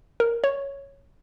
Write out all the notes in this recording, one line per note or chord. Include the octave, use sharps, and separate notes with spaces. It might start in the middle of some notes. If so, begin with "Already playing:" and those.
A#4
C#5